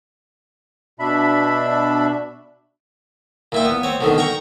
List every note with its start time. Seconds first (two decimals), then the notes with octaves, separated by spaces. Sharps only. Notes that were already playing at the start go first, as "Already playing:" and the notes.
1.00 B2 D4 E5 B5
3.52 A#2 E4 G5
3.65 B3
3.83 C4 C#5
4.01 B2 D3 D#3
4.18 G5 A#5 C#6